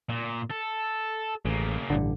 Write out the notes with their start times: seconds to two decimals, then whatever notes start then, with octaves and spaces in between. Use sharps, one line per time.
0.09 A#2
0.50 A4
1.45 A1 C#3 A#3
1.90 A1 G2 D3